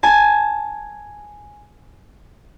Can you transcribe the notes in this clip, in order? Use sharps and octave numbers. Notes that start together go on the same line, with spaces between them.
G#5 A5